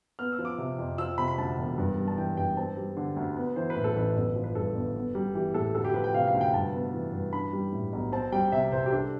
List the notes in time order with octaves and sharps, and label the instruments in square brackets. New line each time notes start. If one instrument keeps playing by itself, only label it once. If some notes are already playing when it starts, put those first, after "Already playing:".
[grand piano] B3 F6
E6
F3
D6
C3
F2
F3 E6
C3 B5
B5
D2 A5
E1
G2
G3
A5
E3 G5
G2 G5
C4 A5
G3
D3
D2
B3
E3 C5
B4
A2
A4
A1 B4
G1
F3
B4
G2 A4
G1
B3
G3
E3 G4
A2 A4
D2 A4
G4
F3 B4
G5
C3 F5
F5
D2
G5
G2 A5
B3
E3
G2
D4 B5
G3
A2
B1
C4 A5
G3 G5
C3 E5
C2 C5
G4
D4 A4